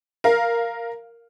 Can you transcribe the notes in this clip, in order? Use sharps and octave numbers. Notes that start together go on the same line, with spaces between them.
A#4 F5